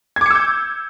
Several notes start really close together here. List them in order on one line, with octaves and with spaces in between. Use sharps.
G#6 D6 C#7 E6 G6